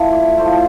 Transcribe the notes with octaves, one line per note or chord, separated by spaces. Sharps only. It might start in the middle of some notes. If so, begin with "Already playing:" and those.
Already playing: F3 A3 E4
D5
F3 A3 E4 C5